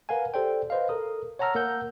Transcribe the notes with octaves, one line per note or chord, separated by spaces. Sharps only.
A#4 B4 F5 F#5 G#5
G4 A4 C5 D5 G5
B4 C5 D#5 F5
A4 A#4 D#6
C#5 F#5 A5 A#5 E6 F6
A#3 A#4 F#5 E6 G6